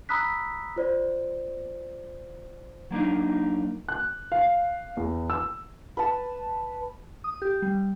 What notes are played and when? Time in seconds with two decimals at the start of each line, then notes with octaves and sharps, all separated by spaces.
0.09 A#5 B5 D#6 E6 F#6 B6
0.76 F4 C5 D5
2.91 F#3 A#3 D4 D#4
3.88 F#6
4.32 F5
4.97 E2
5.30 E6
5.97 B4 A5
7.24 D#6
7.42 G4
7.62 G3